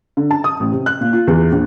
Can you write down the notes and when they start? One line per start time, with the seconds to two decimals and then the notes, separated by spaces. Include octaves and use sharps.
0.17 D3
0.31 A5
0.44 D#6
0.60 A1
0.72 C3
0.86 F#6
1.01 A#2
1.13 F4
1.27 E2
1.52 A#1